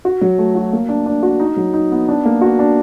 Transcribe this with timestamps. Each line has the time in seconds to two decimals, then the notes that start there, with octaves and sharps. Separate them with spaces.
0.05 F#4
0.21 F#3
0.38 A3
0.55 F#4
0.73 A#3
0.89 D4
1.06 D4
1.23 F#4
1.40 D#4
1.57 F#3
1.74 D#4
1.92 B3
2.08 D4
2.25 A#3
2.41 F#4
2.59 D4